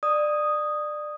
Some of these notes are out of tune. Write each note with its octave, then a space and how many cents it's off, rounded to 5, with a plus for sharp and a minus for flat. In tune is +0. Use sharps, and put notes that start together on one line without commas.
D5 +25 D#6 +0